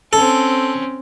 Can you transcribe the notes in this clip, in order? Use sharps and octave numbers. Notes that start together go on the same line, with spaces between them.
C4 C#4 A4